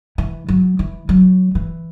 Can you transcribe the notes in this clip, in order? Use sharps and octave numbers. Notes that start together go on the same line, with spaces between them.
E3
F#3
E3
F#3
E3